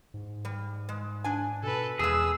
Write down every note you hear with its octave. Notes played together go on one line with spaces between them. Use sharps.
G#2
G3
G#3
D4 G#5
B2 A4 B4
E2 E3 G#3 G#4 E6